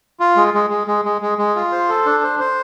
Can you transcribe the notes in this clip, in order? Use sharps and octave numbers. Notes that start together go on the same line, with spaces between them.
F4
G#3
G#3
G#3
G#3
G#3
G#3
G#3
F4
C5
A4
D4
C5
C5